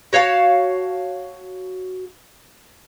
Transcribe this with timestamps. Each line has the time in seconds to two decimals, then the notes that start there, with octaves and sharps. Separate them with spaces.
0.13 F#4 C#5 F5 A5